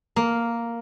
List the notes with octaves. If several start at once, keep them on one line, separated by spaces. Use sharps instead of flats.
A#3